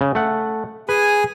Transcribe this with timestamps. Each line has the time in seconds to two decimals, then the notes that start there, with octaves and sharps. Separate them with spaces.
0.01 C#3
0.15 A3 F#5
0.89 G#4 B4 G#5